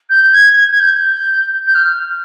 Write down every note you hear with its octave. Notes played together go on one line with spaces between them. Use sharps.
G6
G#6
G#6
G#6
G6
G6
F6